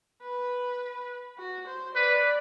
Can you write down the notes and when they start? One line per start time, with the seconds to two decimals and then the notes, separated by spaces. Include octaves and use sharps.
0.23 B4
1.39 F#4
1.67 C5
1.95 B4 D5